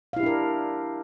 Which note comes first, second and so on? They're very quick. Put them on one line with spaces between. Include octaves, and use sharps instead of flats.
F5 E4 G4 D4 A#4